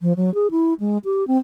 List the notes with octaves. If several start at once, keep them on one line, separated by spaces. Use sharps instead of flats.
F3
F#3
G#4
E4
G#3
G4
C4